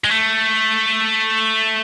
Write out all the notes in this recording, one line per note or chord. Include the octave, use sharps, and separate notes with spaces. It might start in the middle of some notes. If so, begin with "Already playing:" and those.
G#3
A3